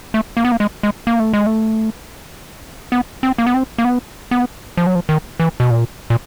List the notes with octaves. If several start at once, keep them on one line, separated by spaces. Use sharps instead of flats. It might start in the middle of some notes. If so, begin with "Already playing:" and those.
A3
A#3
B3
A#3
G#3
G#3
A#3
A3
G#3
A3
B3
C4
A#3
B3
C4
A#3
B3
B3
F3
F#3
F3
D#3
E3
B2
A#2
A#2